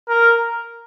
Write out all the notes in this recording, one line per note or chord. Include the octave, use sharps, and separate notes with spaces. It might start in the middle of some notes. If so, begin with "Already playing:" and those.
A#4